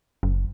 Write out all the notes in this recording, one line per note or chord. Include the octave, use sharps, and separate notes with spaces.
F#1